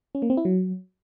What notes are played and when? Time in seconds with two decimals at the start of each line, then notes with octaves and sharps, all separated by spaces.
0.15 C#4
0.22 A#3
0.30 C4
0.37 E4
0.45 F#3